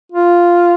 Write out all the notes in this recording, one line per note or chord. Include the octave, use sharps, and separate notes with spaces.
F4